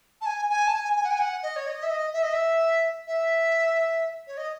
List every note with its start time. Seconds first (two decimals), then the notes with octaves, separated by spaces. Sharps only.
0.21 A5
0.26 G#5
0.49 G#5
0.67 A5
0.73 G#5
0.96 G#5
1.04 F#5
1.11 G#5
1.20 F#5
1.43 D#5
1.56 C#5
1.67 D#5
1.83 E5
1.90 D#5
2.13 E5
2.23 D#5
2.33 E5
3.07 E5
4.27 C#5
4.37 D#5